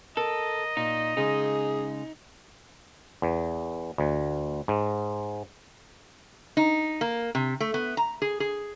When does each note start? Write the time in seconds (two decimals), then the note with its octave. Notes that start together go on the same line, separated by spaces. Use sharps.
0.17 A4 A#4 D#5
0.77 A#2 D#4
1.17 C#3 G#3 D#4 G#4
3.22 E2
3.98 D2
4.68 G#2
6.57 D#4
7.01 A#3
7.35 C3
7.60 A3
7.74 B3
7.97 A#5
8.22 G#4
8.40 G#4